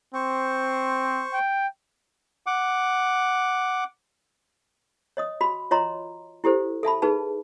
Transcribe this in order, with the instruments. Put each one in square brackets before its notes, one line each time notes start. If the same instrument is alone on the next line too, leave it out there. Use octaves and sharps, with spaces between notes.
[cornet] C4 [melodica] C5 C#6
[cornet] G5
[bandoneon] F#5 D6
[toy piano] C#5 D#5 D#6
F#4 B5
F4 C#5 D#5 A#5 C6
E4 G4 A4 C5
A4 E5 A5 B5
D#4 G#4 B4 A5